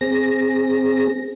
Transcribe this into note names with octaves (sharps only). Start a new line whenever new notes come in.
C4 G#4 A#6